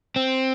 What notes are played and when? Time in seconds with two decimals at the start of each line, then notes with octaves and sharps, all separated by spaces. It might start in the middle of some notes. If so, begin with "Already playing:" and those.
0.16 C4